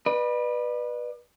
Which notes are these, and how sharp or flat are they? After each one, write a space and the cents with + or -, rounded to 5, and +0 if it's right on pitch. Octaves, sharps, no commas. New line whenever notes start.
B4 -15 D5 +40